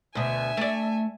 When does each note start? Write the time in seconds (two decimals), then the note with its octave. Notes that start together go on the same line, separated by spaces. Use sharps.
0.15 D2 B2 E5 G#5
0.57 A3 D5